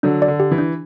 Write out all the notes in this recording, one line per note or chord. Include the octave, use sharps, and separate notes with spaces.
D3 F#3 D4
D5
D3
G4
E3
D4